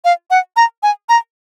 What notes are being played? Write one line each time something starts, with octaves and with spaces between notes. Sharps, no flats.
F5
F#5
A#5
G#5
A#5